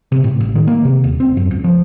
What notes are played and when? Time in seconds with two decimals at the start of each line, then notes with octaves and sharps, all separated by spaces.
0.12 C3
0.24 A2
0.40 A1
0.55 D#3
0.67 A#3
0.85 C3
1.04 D#1
1.20 C4
1.37 F#2
1.51 C#2
1.64 F3